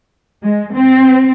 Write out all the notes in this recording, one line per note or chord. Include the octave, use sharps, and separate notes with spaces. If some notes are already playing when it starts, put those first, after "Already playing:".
G#3
C4